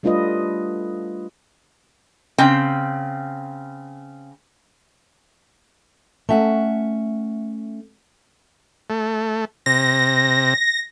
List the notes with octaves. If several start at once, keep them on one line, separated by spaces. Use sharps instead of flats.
G3 A3 D4 F4 B4 D#5
C#3 C4 G5
A3 C#4 E5 F#5
A3
C3 A#6